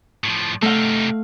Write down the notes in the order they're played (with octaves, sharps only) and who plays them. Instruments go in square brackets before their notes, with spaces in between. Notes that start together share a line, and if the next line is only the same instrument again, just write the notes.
[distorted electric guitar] A2 F3
[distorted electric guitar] C3 D#4 [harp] A3 F5